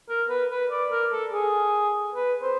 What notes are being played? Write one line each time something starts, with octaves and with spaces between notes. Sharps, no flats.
A#4
B4
B4
D5
A#4
A4
G#4
B4
C5